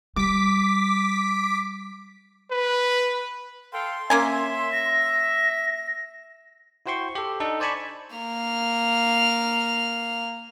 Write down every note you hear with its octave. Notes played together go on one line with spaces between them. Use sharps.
G3 D6 B6
B4
A4 F5 G5 C6
A#3 C#4 E5 G#5
A#6
E4 F#4 C5 G5 C6 C#6
G4 A4
D4 D#4 A4
C5 D5 G#5 A5 B5 C#6
A#3 F6